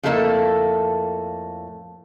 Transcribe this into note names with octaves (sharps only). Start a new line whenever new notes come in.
F2 A2 A3 A#3 D4 A4